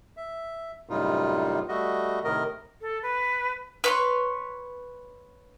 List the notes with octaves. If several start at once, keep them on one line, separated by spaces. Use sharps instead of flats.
E5
F#2 A2 C3 G3 D#4 F4
G3 A3 F#4 D#5
A2 C3 D#3 A#4 D#5
A4
B4
B4 C#5 C6